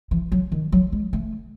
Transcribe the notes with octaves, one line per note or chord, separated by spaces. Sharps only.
E3
F#3
D#3
F#3
G#3
A3